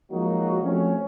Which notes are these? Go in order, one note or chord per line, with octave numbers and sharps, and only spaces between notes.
F3 F#3 G#3 A#3 D#4 F#4
F3 A3 C4 C#4